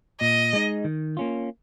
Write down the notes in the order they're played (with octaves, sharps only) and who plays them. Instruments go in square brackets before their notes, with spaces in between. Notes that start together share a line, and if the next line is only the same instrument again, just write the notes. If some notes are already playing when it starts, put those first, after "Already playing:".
[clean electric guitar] A#2 [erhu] D#5
[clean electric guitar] G#3 D#4
D#3
A#3 C#4 F4